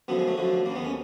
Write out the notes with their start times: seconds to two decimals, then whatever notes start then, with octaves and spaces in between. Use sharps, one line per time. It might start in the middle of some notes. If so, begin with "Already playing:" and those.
0.08 F#2 D3 F3 B3
0.19 G#3
0.28 A3
0.38 F#2 D3 F3
0.65 D#2 D#3 A#3
0.76 B3
0.85 C#4